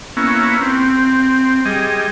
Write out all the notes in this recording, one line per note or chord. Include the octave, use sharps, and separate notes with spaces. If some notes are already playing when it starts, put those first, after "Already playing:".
A#3 B3 C#4 E4
C4
G3 G#4 D#5